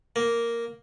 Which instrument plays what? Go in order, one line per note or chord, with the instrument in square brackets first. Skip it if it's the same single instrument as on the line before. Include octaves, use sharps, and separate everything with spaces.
[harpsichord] A#3